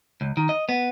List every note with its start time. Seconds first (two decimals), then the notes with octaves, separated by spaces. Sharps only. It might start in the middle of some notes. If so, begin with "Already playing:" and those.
0.21 C#2
0.37 D#3
0.49 D#5
0.69 B3